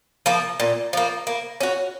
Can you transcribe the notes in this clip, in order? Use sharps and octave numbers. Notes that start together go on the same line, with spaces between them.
F3 A#3
A#2
F3 A#3
A#3
C#4 F#4